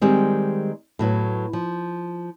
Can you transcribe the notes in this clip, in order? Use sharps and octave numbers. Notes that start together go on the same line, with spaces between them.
D#3 G3 G#3 C4
A2 F#3 B3
F3